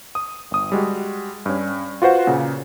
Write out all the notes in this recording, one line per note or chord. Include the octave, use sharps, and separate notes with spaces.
D#6
G1 D#6
G3 G#3 F#4
G2 C#4
F4 F#4 B4 C5 F#5
A#2 C#3